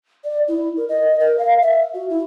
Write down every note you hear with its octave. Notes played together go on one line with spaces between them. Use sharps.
D5
E4
A#4
D#5
A#4
F5
E5
F#4
E4